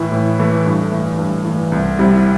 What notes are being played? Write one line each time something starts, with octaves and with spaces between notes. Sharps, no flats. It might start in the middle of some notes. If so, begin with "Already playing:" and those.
Already playing: A2 E3 A3 E4
A2
E3 A3 E4
G2
E3 A3
G2
E3 A3
C2
C3 G3 E4